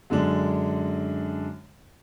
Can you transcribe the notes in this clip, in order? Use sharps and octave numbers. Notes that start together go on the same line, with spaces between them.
F#2 D3 G#3 D4